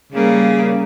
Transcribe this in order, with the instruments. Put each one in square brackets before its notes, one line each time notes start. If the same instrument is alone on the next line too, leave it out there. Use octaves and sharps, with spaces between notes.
[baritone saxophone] C#3 [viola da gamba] G3 A#3